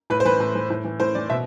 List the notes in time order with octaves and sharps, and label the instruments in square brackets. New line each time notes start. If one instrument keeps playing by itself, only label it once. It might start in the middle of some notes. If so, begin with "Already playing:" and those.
[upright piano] A2 B4
C5
E3 B4
A2
E3
A2
E3
A2 C5
E3 D5
B2 E5